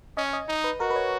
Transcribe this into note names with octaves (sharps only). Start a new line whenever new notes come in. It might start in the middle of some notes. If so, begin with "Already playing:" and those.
C#4 D#5
D#5
D#4
B4
F#4 A#4
B4
C#5